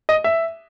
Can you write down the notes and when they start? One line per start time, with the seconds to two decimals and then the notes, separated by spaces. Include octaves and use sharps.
0.09 D#5
0.24 E5